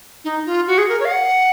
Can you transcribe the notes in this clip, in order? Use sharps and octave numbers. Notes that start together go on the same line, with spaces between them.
D#4
F4
F#4
G#4
A#4
C#5
F5
F#5